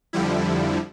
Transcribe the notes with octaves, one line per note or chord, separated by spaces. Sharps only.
F2 D3 F3 G3 E4